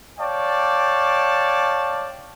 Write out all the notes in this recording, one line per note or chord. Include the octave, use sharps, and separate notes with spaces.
C#5 D5 F5 G5 A5